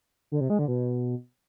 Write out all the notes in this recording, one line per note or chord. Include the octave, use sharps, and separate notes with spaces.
D3
C3
G#3
D3
B2